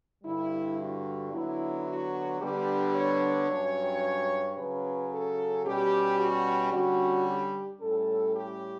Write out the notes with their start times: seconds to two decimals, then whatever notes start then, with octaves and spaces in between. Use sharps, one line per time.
0.24 G2 D3 G3 E4
0.79 F#4
1.32 D3 F#3 B3 E4
1.86 F#4
2.40 D3 G3 B3 D4 G4
2.95 C#5
3.49 G2 F#3 C#4
4.56 C#3 F#3 C#4 B4
5.11 A4
5.64 B2 G3 C#4 G4
6.18 F#4
6.72 D3 G3 C#4 F#4
7.27 G4
7.80 A2 G3 C#4 A4
8.34 G4